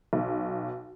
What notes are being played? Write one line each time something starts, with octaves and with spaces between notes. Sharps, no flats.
B1